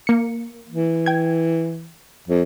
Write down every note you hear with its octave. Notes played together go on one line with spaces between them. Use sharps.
A#3 C#7
E3
G5 G#6
F2